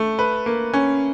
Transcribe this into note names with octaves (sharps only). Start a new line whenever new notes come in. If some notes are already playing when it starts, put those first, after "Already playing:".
Already playing: A3
B4
A#3
C#4